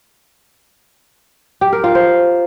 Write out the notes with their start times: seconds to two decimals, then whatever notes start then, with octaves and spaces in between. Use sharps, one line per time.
1.61 G4
1.73 A#4
1.84 F4
1.95 C5